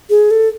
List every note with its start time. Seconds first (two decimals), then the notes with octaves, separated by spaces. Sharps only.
0.10 G#4
0.31 A4